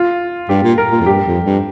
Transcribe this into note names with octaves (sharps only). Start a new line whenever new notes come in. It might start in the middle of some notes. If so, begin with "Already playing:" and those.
Already playing: F4
G2 G4
A#2
A#4
A#2
F2
G2 G4
F2
G2